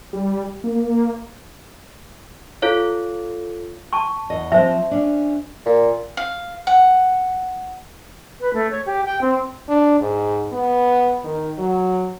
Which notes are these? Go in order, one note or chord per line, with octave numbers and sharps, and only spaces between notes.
G3
A#3
F4 A4 C#5 F5
A5 C#6
E2 D#5
F3 C4 C5 E5
C#4 D4
A#2
F5
F#5
B4
A3
C#5
G4
G5
C4
D4
G#2
B3
D#3
F#3